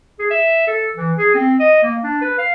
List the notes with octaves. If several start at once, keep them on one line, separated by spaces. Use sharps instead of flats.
G#4
E5
A4
E3
G#4
C4
D#5
A#3
D4
B4
F5